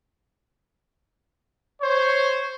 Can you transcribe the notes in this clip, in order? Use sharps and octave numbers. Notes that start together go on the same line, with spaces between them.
C5 C#5